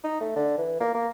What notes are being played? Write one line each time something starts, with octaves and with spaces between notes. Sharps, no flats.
D#4
A3
D3
E3
A#3
A#3